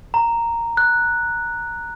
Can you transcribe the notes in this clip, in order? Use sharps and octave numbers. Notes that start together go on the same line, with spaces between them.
A#5
F#6